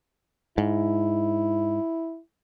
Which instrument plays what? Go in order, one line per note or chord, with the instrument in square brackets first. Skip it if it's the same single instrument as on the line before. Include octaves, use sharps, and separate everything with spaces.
[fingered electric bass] G#2 [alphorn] E4